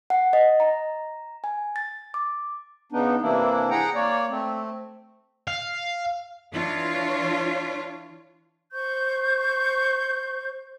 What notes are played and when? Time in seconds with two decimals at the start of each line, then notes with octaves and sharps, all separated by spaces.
0.10 F#5
0.33 D#5
0.60 A#5
1.44 G#5
1.76 A6
2.14 D6
2.92 C#3 B3 D4 D#4
3.22 C3 E3 A#3 D4 E4
3.70 G#4 F#5 G5 A#5
3.95 A#3 C#5 D5
4.30 A3 C4
5.48 F5
6.54 E3 D4 F4 C#5
8.73 C5 C#6 G6